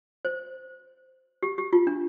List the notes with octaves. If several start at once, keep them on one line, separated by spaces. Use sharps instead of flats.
C5
G4
G4
F4
D4